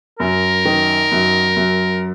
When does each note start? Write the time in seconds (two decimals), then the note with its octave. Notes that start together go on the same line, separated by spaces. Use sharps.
0.19 F#2 A#4
0.65 D#3
1.12 F#2
1.57 F#2